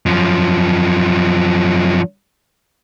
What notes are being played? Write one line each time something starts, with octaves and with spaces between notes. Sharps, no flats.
F#2 F3